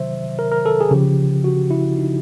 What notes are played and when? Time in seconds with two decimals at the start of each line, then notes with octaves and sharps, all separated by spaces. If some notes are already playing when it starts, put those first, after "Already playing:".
Already playing: C3 D#3 F#3 C5 E5
0.39 A#4
0.51 A#4
0.66 A4
0.81 G#4
0.91 C#3 F3 G4
1.44 F#4
1.71 E4
1.98 D#4